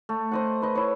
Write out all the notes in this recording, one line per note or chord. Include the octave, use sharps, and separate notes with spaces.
A3
C5 D#5 F#5
B4 D#5
E4 C#5